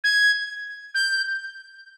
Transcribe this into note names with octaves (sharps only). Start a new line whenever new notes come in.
G#6
G6